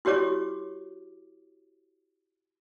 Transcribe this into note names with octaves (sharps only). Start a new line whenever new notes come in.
E4 F#4 G4 C#5 D6